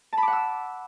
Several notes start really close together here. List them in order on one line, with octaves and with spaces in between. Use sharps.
A5 B5 D6 F#5 E6